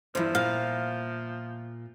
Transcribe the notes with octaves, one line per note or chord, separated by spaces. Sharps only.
E2 G2 F3 E4 C5
A#2 F5